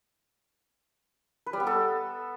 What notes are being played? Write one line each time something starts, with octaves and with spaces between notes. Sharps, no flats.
B4
G3
B3
A4